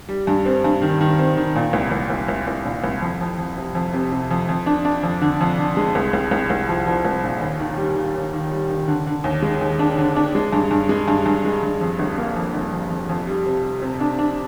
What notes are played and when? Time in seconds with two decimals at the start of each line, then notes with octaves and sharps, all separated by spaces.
0.09 G3
0.27 G2
0.45 C4
0.64 G2
0.82 D#3
1.01 D#3
1.19 C4
1.37 D#3
1.55 A#2
1.73 C2
1.91 C2
2.10 C2
2.29 C2
2.47 C2
2.65 A#2
2.84 C2
3.02 F2
3.21 F2
3.39 F2
3.57 C3
3.75 F2
3.93 C3
4.12 C3
4.31 F2
4.49 F2
4.66 D4
4.85 D4
5.03 F2
5.22 D3
5.41 F2
5.58 D3
5.77 G#3
5.95 C2
6.13 C2
6.31 C2
6.50 C2
6.69 F3
6.87 F3
7.05 C2
7.23 A#2
7.41 D#2
7.59 D#3
7.77 G3
7.96 D#3
8.15 D#2
8.33 D#3
8.52 G3
8.70 D#3
8.88 D3
9.06 D3
9.24 D#2
9.42 G#3
9.61 D#2
9.79 D4
9.98 D3
10.16 D4
10.35 G#3
10.53 G2
10.71 G2
10.89 G#3
11.08 G2
11.26 G2
11.45 G#3
11.63 G2
11.81 F2
11.99 G1
12.17 A#3
12.36 F2
12.54 G1
12.72 F2
12.90 F2
13.09 F2
13.27 G3
13.46 C3
13.63 G3
13.82 C3
14.00 D4
14.19 D4